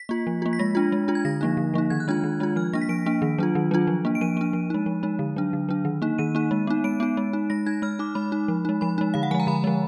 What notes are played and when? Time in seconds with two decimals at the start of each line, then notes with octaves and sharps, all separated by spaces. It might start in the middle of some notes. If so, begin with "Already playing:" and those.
Already playing: B6
0.09 A#3 F4
0.27 F3
0.42 A#3 F4
0.53 B6
0.59 G#3 A#6
0.75 D4 F4
0.92 G#3
1.08 D4 F4
1.15 G#6
1.25 D3 A#6
1.41 F3 A#3 D#4
1.57 D3
1.74 F3 A#3 D#4
1.90 D#3 G#6
2.00 F#6
2.08 G#3 D4 F4 G#6
2.24 D#3
2.40 G#3 D4 F4
2.56 F3 F6
2.73 A#3 D4 A#6
2.82 B6
2.89 F3 D7
3.06 A#3 D4
3.22 D#3
3.38 F#3 D4 F4
3.55 D#3
3.71 F#3 D4 F4
3.87 F3
4.05 A#3 D4
4.15 D7
4.21 F3 D#7
4.37 A#3 D4
4.53 F3
4.70 G#3 D#4
4.86 F3
5.03 G#3 D#4
5.19 D3
5.36 F#3 D4
5.53 D3
5.69 F#3 D4
5.85 D#3
6.02 A#3 D#4
6.18 D#3 D#7
6.35 A#3 D#4
6.51 G#3
6.67 B3 D#4
6.84 G#3 D7
7.00 B3 D#4
7.17 G#3
7.33 D#4
7.50 G#3 A#6
7.66 D#4 G#6
7.82 G#3 F6
7.99 D#4 D6
8.15 G#3 B5
8.32 D#4
8.48 F3
8.65 G#3 D#4
8.81 F3 B5
8.98 G#3 D#4
9.14 D3 F5
9.23 F#5
9.31 F3 G#5
9.35 G#3
9.40 A#5
9.47 D3 B5
9.64 F3 G#3